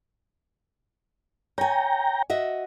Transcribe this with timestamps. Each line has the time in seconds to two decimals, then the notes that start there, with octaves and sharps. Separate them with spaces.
1.58 C#5 G5 G#5 A#5
2.30 F#4 D#5 E5